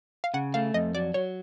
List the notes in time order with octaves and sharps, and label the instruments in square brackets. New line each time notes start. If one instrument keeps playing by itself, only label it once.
[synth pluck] F5
[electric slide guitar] C#3 [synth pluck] F#5
[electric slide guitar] A3 [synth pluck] F5
[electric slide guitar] F2 [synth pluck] D#5
[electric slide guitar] F#3 [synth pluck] D5
[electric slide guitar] F#3 [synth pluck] C#5